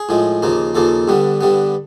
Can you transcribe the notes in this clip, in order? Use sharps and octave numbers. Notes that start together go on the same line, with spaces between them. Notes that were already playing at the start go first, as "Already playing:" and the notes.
Already playing: G#4
A2 F3 G#3
D#2 C#3 F3 A#3
D#2 C#3 F3 A#3 A4
G2 D3 G3 B3
G2 D3 G3 B3